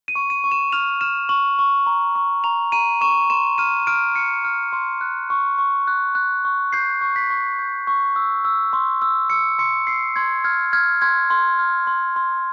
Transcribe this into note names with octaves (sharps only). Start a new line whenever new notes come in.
D#7
C#6
D#7
C#6
E7
F6 F7
F6 E7
C#6 F#7
C#6
A#5
C#6
A#5 F7
A#5 D#7
C#6 E7
C6 E7
F6 D#7
F6 D7
F6 C#7
F6
C6
F#6
C#6
C#6
F#6
F#6
C#6
G6 C7
C#6
B6
C#6
G6
C#6
E6
E6
C6
E6
E6 C#7
C6 C#7
E6 C7
C6 G#6
F6 G#6
F6 G#6
C6 G#6
C6
F6
C6
C6